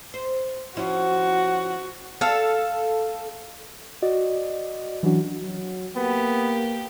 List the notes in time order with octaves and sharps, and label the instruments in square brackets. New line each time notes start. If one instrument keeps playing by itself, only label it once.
[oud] C5
[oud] F3 C#4 E4 [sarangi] F#4
[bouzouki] A4 F5
[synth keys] F#4 D5 D#5
E3 F#3 C#4 D4 F#4
[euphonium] F#3
[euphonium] A#3 [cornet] B3 [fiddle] G4